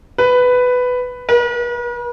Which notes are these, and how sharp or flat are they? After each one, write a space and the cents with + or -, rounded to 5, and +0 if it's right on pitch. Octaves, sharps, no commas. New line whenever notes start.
B4 +10
B4 -45